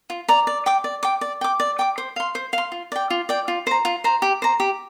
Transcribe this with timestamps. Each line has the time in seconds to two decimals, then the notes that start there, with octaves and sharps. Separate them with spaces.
0.10 F4
0.28 D5 A#5
0.47 D5
0.66 G5 D6
0.84 D5
1.03 G5 D6
1.21 D5
1.41 G5 D6
1.60 D5
1.79 G5 D6
1.98 C5
2.16 F5 C6
2.35 C5
2.53 F5 C6
2.72 F4
2.92 D5 G5
3.10 F4
3.29 D5 G5
3.48 F4
3.67 C5 A#5
3.85 F4
4.04 C5 A#5
4.22 G4
4.42 C5 A#5
4.60 G4